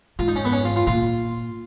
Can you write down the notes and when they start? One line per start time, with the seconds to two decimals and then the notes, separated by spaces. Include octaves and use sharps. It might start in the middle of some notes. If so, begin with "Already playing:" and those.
0.19 G#2 F4
0.28 D#4
0.36 C#4
0.45 B3
0.53 C#4
0.65 F4
0.76 F4
0.87 A#2 F4